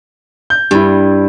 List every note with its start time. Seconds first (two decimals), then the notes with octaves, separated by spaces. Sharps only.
0.50 G6
0.71 G2 G3 E4